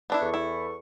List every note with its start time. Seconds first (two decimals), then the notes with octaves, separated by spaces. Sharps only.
0.10 B3 D4 E4
0.22 E2 A4 C#6
0.34 E4